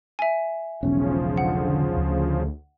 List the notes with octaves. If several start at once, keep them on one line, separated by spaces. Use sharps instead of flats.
E5 G#5
E1 B1 C#3 F3 C#4
D3 F#5
D2